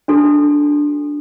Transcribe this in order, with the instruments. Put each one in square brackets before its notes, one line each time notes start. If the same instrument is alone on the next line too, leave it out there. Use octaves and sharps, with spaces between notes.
[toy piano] D4 F#4 A4